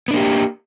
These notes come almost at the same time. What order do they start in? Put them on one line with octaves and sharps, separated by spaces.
B3 D4 A#3 G4